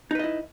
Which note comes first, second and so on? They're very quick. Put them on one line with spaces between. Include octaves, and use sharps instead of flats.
D#4 B4 D#5 E4